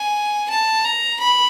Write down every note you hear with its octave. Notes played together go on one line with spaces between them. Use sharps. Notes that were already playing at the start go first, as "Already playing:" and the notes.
Already playing: G#5
A5
A#5
B5